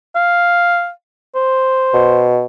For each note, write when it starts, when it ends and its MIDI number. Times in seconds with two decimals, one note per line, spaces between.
0.16 0.90 77
1.35 2.32 72
1.94 2.45 47